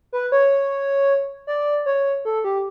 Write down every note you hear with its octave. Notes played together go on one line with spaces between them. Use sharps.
B4
C#5
D5
C#5
A4
G4